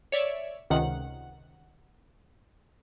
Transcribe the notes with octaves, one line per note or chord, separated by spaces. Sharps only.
C#5 D5 E5
C#2 C3 D#3 F#5